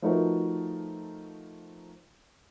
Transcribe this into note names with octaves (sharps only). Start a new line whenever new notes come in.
F3 A3 D#4 F#4 A#4 B4